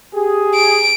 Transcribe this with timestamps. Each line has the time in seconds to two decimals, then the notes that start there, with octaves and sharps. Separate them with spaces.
0.15 G4 G#4
0.55 D7